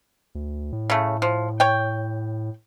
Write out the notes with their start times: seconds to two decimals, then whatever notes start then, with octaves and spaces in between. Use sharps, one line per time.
0.35 D2
0.72 A2
0.90 C#3 A3
1.22 F3
1.60 C#5 G5